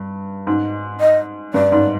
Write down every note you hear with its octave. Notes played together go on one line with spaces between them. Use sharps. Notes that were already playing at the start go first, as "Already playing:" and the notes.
Already playing: G2
G#2
D#5
G2 D5
G#2